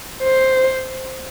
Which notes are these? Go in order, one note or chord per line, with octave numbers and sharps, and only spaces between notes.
C5